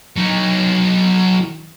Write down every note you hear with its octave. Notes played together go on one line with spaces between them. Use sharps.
F#3 D#4